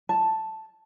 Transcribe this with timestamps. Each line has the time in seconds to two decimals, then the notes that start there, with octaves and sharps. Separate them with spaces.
0.09 A5